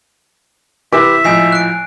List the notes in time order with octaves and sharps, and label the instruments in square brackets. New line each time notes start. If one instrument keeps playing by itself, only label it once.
[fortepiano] C3 E3 [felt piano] G4 B4 D6 [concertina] E5
[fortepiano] G#1 A2 [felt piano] F3 D#5 [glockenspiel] G#5 C7
[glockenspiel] F#6 D7